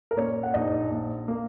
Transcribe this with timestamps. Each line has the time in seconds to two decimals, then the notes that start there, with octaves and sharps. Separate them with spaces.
0.11 A#4
0.17 A#2 C#4 C#5
0.43 F#5
0.54 A#1 D#4 D#5
0.90 A#2
1.28 A#3